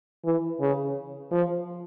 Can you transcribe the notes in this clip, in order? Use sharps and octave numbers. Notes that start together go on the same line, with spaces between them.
E3
C#3
F3